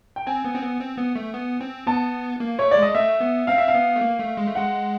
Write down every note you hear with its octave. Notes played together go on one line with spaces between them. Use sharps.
G5
C4 G#5
B3
C4
B3
C4
B3
A3
B3
C4
B3 A5
A#3
A3 C#5
G#3 D5
D#5
A3 E5
B3
C4 F5
E5
F5
B3
A3
A#3
A3
G#3
A3
G#3 F#5